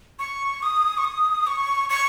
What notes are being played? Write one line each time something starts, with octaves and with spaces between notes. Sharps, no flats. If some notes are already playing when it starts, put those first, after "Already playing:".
C#6
D#6
C#6
D#6
C#6
C#6